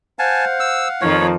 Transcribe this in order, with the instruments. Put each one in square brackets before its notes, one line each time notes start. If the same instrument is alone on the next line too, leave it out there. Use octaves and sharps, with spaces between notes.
[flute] C5 [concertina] F5 F#5 [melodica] G#5 A5
[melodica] E6
[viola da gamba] F2 D#3 F3 [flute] D#4 [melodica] C#5